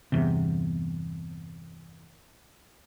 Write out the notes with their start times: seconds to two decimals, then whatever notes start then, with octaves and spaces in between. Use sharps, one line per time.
0.12 G1 E2 C3